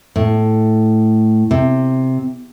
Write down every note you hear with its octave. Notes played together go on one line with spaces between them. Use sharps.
A2
C3